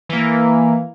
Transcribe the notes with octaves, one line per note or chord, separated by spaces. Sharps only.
E3 A#3